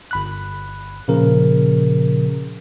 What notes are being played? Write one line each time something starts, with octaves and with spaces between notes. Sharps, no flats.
G1 B5 F#6
A#2 C#3 F3 A#4